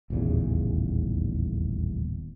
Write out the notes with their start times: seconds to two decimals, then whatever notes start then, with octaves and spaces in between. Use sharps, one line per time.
0.10 D#1 A1 E2 C#3